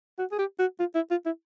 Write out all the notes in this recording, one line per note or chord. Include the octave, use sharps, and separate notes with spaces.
F#4
G#4
G4
F#4
F4
E4
F4
E4